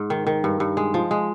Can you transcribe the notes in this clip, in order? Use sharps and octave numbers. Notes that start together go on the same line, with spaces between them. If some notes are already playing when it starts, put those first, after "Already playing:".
Already playing: G#2
D#3
D#3
G2
G2
G#3
F3
G#3